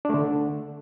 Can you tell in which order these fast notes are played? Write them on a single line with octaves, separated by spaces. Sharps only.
D4 A3 D3